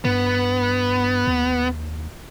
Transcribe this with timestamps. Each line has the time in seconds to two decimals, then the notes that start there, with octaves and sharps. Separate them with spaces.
0.05 G2 B3
1.27 D#2